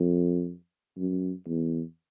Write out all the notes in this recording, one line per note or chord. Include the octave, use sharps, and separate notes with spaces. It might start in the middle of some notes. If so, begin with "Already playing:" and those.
Already playing: F2
F#2
E2